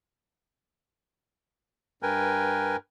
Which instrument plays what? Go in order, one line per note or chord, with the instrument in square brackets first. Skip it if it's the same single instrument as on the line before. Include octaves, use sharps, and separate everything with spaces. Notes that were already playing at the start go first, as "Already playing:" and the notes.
[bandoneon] G2 A#4 B4 G5 G#5